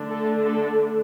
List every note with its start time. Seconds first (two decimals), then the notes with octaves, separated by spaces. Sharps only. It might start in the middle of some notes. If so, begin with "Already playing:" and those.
Already playing: D3 A3 D4
0.10 A4
0.46 A4